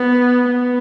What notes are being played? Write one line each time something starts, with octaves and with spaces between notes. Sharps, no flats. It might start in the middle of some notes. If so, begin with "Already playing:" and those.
Already playing: B3
B3